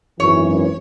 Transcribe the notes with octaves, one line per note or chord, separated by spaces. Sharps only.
G#1 F#2 E3 C#5